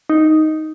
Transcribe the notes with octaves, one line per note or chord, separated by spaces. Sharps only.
D#4